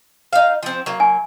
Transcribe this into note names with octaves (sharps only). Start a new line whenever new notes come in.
D#4 F5
F3 C4
F#3 A#3
G#5